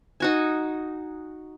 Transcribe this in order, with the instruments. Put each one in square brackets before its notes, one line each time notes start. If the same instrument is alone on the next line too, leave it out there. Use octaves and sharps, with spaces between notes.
[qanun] D#4 F#4 G#5